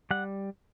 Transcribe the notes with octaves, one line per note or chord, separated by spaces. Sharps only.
G3 F#5